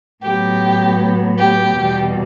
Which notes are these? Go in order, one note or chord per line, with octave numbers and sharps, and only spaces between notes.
A2 F#3 B3 G4
G4
E2 B2 G3